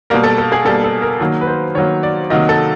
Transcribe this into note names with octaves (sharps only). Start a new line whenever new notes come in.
B2 G3 A#3 A#4
A4
A4
G#4
B2 G3 A#3 A4
A4
A#4
D#3 F#3 A#3
B4
C5
D#3 F#3 A#3 C#5
D5
C3 D#3 F#3 A#3 D#5
A4